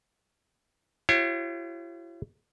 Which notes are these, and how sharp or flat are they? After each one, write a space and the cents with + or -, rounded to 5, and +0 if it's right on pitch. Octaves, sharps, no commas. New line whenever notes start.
E4 +45 G4 -45 C#5 -35